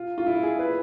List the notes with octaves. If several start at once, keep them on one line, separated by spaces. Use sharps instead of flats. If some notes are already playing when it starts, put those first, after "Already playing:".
Already playing: F4
F4
E4
G#4
B4